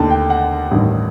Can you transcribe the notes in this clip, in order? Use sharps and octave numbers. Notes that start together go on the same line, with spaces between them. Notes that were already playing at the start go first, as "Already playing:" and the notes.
Already playing: D#2 D3 A3 A5
G5
F#5
A1 G2 D#3